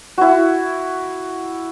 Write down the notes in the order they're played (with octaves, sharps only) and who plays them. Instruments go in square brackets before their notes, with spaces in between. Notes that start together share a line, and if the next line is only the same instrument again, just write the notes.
[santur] E4 F#4